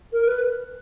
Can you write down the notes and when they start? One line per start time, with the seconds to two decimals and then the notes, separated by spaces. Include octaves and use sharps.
0.13 A#4
0.26 B4